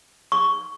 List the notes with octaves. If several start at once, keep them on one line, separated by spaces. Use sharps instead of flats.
C#6